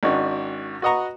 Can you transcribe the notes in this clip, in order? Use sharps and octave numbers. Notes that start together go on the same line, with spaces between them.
G#1 D#3 C#4 D4 F#4
F#4 B4 D#5 F#5 A#5 C#6